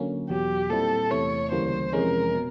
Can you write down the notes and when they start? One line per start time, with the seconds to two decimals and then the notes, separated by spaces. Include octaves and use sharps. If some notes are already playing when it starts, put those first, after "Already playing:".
Already playing: D3 F#3 A#3 C#4
0.30 E2 B2 F#3 G4
0.70 A#2 G3 C4 E4 A4
1.11 E2 C3 E3 A3 C#5
1.51 D2 C#3 E3 G3 A#3 C5
1.93 F2 C3 E3 G#3 C#4 A#4
2.35 B2